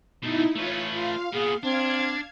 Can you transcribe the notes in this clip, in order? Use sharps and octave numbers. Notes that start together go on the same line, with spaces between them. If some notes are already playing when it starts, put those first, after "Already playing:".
B2 A3 D#4 E4
A3 F4 B4 C#5
F4 F5
A#2 B3 G#4
C4 D4 F5 G#6